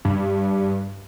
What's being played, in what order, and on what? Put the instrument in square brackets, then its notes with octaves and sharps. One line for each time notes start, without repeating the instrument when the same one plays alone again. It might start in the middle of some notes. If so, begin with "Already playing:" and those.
[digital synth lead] G2